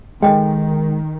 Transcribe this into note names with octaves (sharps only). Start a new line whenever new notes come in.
D#3 G#3 A4 D#5 G5